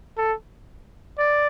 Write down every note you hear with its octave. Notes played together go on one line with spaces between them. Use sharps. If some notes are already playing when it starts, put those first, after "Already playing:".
A4
D5